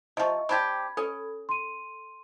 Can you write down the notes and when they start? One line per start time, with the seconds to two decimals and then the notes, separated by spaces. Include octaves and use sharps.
0.17 C3 F3 D#5 E5 C#6
0.49 C4 D4 G4 B5 G#6
0.97 C#4 A4
1.49 C6 D#7